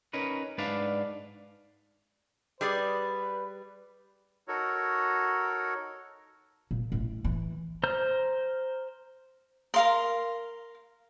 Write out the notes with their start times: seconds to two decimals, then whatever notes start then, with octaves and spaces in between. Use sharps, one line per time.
0.13 C#4 D#4 A#4 B4
0.58 G#2 D4 B4 D5 F5
2.61 G3 G#4 B4 D5
4.48 D#4 F#4 A4 A#4 C#5
6.71 A#2
6.92 A1
7.24 E3
7.84 C5 A#5 F6 G6
9.74 A#4 F5 C6